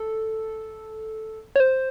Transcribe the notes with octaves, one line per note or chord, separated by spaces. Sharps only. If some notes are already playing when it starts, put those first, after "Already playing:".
Already playing: A4
C#5
C5